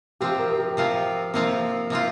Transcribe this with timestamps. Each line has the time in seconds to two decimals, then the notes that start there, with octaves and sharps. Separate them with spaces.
0.20 C3 F3 C4 F4 G4
0.32 G4
0.39 A#4
0.50 A#4
0.58 G4
0.77 C3 F3 C4 F4
1.33 C3 F3 A#3 C4 F4
1.90 C3 F3 C4 F4